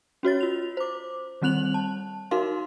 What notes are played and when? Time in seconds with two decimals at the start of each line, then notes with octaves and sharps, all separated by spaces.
0.23 C#4 F#4 C#5 A6
0.40 F4 F7
0.77 C5 D6
1.42 D#3 G3 C4 F#6 F7 F#7
1.74 A5
2.31 D#4 F#4 A#4 F5 C6